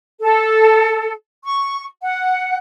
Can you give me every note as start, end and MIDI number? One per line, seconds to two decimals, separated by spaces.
0.21 1.12 69
1.45 1.85 85
2.03 2.56 78